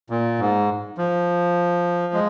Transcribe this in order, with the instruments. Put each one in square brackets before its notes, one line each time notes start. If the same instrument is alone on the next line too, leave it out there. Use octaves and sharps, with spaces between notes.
[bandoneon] A#2
G#2
F3
G#3